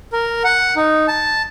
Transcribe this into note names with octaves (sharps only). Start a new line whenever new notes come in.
A#4
F#5
D#4
A5